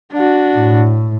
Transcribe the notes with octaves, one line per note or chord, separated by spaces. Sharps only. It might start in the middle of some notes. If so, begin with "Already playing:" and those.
D4 F#4
A2